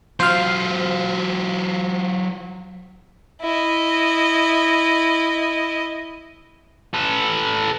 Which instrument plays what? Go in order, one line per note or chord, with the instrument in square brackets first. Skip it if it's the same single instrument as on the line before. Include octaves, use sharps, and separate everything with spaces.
[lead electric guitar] F#3 F4 [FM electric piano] C5 F5
[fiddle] E4 D#5
[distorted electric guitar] A4 B4